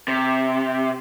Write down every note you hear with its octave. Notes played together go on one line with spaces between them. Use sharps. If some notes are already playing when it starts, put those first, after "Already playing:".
C3